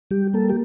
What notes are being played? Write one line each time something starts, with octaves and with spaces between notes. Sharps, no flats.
G3 G4
A#3 A4
G4